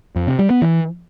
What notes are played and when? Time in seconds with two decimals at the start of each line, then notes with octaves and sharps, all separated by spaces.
0.16 F2
0.27 C3
0.39 G3
0.50 B3
0.62 E3